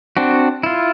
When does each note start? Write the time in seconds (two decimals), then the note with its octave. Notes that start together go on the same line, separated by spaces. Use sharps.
0.17 C4 D4 F#4
0.63 E4 F4